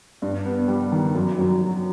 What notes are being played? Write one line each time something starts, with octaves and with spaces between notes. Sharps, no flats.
G2
B3
G3
D#3
F#2
F#2
F#3